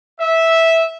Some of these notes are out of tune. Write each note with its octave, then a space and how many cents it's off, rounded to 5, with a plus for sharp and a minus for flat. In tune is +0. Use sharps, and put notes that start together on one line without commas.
E5 -10